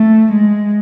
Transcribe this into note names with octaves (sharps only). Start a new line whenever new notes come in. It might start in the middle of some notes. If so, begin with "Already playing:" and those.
Already playing: A3
G#3